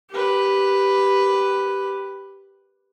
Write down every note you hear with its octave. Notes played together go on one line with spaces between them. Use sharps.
G4 B4